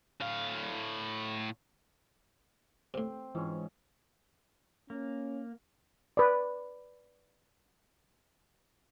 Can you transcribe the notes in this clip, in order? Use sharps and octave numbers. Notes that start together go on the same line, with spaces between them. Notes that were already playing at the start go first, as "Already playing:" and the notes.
A2 F5
A2 C3 C4
G#2 E3 C#4 F4
A#3 C#4
B4 D5